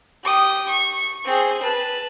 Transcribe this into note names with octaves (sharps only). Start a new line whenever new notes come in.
G4 D#6
C#6
C4 G#4
B4 A5